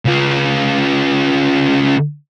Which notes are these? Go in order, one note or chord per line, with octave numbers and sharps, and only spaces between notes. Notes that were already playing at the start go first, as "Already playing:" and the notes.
C#3 F4